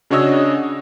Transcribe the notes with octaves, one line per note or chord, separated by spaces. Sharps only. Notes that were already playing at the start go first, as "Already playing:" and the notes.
C#3 D4 F#4 C#5 D#5 E6